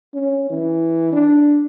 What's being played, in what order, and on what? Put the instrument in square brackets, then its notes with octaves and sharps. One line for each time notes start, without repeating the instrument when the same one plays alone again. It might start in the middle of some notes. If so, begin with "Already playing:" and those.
[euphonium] C#4
E3
D4